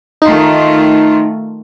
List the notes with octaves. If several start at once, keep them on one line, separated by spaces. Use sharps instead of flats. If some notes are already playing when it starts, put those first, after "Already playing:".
D#3 A3 D#4 F4